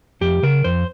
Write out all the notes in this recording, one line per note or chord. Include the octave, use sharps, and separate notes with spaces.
F2 G4
C#3 A#4
F2 C5